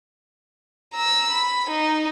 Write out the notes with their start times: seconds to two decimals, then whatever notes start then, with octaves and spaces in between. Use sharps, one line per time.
0.94 A#5 E6
1.30 B5
1.70 D#4